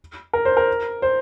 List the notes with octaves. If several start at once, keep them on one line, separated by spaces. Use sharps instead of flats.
A#4
C5
A#4
C5